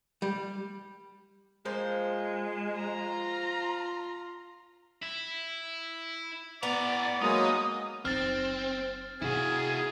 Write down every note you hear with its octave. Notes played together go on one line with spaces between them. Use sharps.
G3
F3 G#3 A#3 C5
F4 A#5
E4
A2 B3 D5 A#5
F#3 G#3 A#3 D#4 D#6
F#1 C4 D#4 F6 A6
C3 E4 F#4 G#4